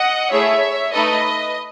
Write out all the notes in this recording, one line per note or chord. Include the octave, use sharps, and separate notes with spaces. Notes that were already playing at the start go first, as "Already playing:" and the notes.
Already playing: D#5 F#5
A3 E4 G#4 C#5 E5
A3 D#4 A4 B4 D#5